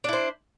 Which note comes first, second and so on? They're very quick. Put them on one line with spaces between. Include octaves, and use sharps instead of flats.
D4 E4 C5